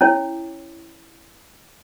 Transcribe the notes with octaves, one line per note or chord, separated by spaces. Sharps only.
C#4 E4 C#5